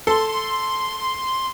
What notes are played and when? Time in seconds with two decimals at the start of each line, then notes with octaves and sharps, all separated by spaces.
0.07 A4 C6